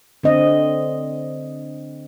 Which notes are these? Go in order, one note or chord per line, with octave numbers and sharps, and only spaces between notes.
D3 C4 D#5